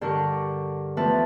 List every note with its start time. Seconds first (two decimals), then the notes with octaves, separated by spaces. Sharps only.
0.01 G2 D3 A#4 F#5 C#6
0.97 E2 F3 A3 E4 B4 A5